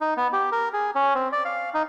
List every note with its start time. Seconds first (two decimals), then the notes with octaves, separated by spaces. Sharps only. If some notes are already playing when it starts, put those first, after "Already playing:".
0.01 D#4
0.17 B3
0.33 G4
0.52 A#4
0.73 G#4
0.95 C#4
1.15 C4
1.32 D5
1.45 F5
1.74 D#4